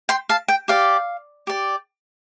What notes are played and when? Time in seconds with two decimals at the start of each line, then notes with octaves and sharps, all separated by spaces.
0.09 G5 C6
0.29 F5 A5
0.48 G5
0.68 G4 D5 F5
1.47 G4 D5